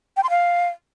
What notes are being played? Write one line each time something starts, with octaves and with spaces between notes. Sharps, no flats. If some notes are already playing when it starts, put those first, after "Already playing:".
G5
C6
F5